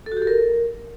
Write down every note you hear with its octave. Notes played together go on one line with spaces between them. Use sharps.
A4
F#4
G4
A4
A#4